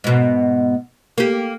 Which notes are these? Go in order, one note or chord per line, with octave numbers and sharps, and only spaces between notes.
G#2 B2
A#3 G4